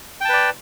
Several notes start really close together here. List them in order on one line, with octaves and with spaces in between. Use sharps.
G5 A5 B4 D5